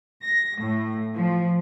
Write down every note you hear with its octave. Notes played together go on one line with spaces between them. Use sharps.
A#6
A2
F3